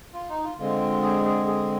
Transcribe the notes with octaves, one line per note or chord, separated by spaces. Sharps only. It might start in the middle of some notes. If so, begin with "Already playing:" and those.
F4
D#4
F4
D3 G#3 C4 F4
G#4
G#4
G#4